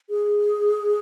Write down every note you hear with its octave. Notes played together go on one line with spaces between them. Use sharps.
G#4